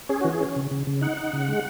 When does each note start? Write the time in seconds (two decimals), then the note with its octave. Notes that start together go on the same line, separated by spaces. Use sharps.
0.09 C#4 G#4
0.21 E3 F#4
0.33 G#4
0.40 C#4
0.56 C#3
0.71 C#3
0.87 C#3
1.01 D#4 F#5
1.17 D#4
1.33 C#3
1.48 G#3